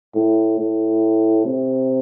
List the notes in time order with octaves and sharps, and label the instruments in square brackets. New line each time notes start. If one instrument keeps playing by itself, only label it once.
[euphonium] A2
A2
C3